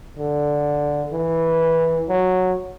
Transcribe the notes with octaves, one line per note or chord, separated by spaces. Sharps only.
D3
E3
F#3